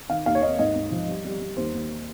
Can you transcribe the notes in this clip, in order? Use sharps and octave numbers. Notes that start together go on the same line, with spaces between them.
D#3 F5
D#2 F5
C#5
D#2 D#5
G#2 D#5
G#2
F3
G3
G3
G3
D#2 C5
D#2